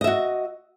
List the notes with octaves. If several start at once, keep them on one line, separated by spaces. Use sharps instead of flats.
F#4 D#5 E5